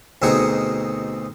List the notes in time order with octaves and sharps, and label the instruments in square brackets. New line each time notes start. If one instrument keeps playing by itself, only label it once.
[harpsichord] D2 B2 C4 D#4 G#4 F#5